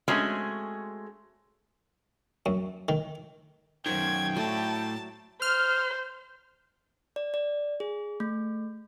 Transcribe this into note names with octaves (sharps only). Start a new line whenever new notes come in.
G#3 A3 C4 C#4 F#4 G#4
F#2
D#3
F#2 D#3 C5 C#5 G5 G#6
A2 F#3 A3 D5 A5
C5 F6
D5
D5
G#4
A3